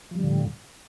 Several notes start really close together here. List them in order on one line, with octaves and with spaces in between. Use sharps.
F3 G3 D3 A2